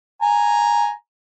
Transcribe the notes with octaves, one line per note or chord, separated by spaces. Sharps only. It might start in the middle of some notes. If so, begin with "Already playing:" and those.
G#5 A#5